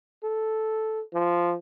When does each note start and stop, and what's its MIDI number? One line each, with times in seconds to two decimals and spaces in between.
0.24 1.02 69
1.14 1.55 53